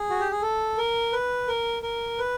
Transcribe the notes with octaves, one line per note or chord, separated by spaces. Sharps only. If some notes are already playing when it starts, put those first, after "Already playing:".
Already playing: G#4
F#4
G4
G#4
A4
A#4
B4
A#4
A#4
B4